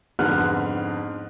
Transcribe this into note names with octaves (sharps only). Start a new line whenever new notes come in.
F2 G#2 D3 B3 F6 F#6